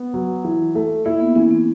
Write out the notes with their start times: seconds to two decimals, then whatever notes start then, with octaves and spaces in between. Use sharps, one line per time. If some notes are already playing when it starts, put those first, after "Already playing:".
Already playing: B3
0.14 F#3
0.45 E3
0.75 A3
1.05 A#3 E4
1.20 B3
1.35 E3 C#4
1.51 C4